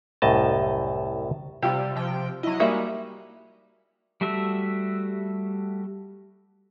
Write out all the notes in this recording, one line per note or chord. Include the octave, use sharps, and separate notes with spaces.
C2 F#2 A2 D#5 A5
C3 G3 F4 G4 E6
C3 F3 G5
F#3 E4 D#5
G3 G#3 A#3 D#4 F#4 E5
G3 A3 F#4 E5